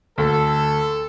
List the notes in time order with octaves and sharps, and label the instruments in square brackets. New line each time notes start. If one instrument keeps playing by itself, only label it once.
[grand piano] D2 [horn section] A4